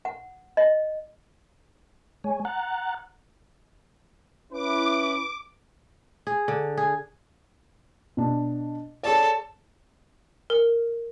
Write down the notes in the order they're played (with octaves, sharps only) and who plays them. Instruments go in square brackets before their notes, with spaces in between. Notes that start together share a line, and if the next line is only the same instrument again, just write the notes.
[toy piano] F#5
D#5
[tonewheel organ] G#3 C#5 G#5
F#5 A#5 F#6 A6
[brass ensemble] C#4 E4 B4 [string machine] D6
[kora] G#4
D3
G#4
[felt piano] B2 D4
[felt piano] G#4 C#5 D5 [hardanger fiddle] A4 A5
[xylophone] A#4